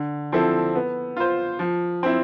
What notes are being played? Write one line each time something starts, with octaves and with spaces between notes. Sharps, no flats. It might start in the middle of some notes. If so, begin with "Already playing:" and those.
Already playing: D3
F3 C4 E4 A4
B3
F4 C5
F3
C4 E4